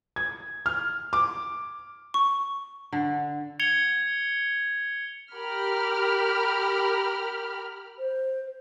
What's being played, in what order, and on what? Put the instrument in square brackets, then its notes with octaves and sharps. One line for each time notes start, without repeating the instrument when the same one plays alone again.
[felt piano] G#6
F6
D6
[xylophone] C#6
[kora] D3
[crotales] G#6 C#7 F7 G7
[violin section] G4 A#4 B5 F6
[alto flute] C5